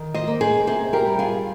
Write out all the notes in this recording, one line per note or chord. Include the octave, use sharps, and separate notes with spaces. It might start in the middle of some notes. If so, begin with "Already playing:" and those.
Already playing: D#3
C5 D#5
A#3
G#4 C5
C3 G#4 C5
G4 A#4
G3
F4 G#4